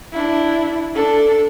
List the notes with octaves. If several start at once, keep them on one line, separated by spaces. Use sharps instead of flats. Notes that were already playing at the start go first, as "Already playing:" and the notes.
D4 E4
D4 A4